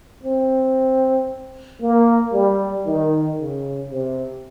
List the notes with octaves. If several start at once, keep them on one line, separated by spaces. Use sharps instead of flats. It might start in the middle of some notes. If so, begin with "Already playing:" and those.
C4
A#3
G3
D#3
C#3
C3